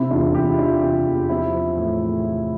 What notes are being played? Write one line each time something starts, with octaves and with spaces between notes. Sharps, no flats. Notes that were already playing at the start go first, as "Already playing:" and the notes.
Already playing: C3 C4 E4
E2 D4 F4
E2 E4 G4
E4
E3 D4 F4
C3
E2
F3 C4 E4
F3
A2
A2
F3